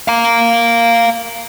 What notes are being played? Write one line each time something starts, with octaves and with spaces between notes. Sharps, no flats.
F5 A#5